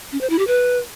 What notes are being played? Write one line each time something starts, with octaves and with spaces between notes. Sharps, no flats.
C#4
C5
E4
G4
B4